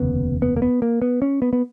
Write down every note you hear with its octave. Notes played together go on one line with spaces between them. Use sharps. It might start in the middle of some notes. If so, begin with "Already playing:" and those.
Already playing: F1 D#2 C#3 B3
B3
A#3
B3
A#3
B3
C#4
B3
B3